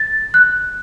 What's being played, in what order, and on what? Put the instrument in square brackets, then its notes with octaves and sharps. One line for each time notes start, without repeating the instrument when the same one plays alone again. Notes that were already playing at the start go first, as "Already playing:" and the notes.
Already playing: [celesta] A6
F#6